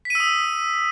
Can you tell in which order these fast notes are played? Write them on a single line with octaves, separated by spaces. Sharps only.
B6 D#7 E6 D#6